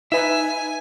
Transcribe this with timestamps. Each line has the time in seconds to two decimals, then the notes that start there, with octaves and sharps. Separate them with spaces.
0.12 D#4 B4 E5 G#5